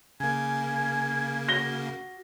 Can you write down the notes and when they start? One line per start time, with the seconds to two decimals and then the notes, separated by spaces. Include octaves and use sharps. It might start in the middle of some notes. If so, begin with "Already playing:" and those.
0.20 C#3 A#3 G#5 G#6
1.48 F#4 A#6 G7